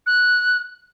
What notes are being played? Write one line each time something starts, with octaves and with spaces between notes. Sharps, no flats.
F#6